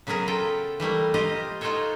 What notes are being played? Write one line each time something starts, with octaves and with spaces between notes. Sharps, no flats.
C#3 F#3 B3 G#4 A#4
F4 A4 G5
E3 G3 A3 A#3
F4 G4 A#4 C5 D#5 F5
D#4 F4 F#4 A4 C5 C#5